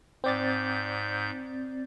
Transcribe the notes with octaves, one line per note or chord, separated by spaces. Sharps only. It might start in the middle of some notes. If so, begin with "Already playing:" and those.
G#2 C4 D5 G6 A6